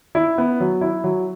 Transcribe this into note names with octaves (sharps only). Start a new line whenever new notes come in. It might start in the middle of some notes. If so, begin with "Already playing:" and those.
E4
B3
F#3
E4
F#3